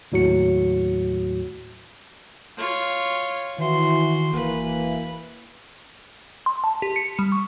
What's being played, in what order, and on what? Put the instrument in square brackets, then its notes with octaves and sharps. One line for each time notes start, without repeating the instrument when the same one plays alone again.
[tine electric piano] D#2 A2 F#3 F#4 C#7
[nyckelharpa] F4 C#5
[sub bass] D#3 [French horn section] E3 E4 [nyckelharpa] F#4 C6
[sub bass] F1 [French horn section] E3 A#3 [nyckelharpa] B4
[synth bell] C6
A5
G4
C#7
G3
C#6